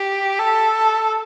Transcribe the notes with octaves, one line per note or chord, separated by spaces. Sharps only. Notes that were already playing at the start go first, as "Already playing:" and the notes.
Already playing: G4
A4